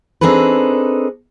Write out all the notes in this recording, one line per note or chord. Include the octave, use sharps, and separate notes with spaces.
C4 D4 D#4 G#4 A4 B4